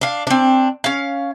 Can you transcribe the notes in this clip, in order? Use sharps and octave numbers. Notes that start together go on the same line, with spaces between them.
D4 F5
C4 D4
C#4 F5